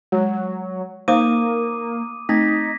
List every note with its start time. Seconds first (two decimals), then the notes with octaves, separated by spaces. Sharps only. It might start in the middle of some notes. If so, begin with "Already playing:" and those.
0.12 F#3 G#3
1.08 A#3 D#4 C5 F5 D6 D#6 D#7
2.29 A3 C4 D#4 G#6 A#6 B6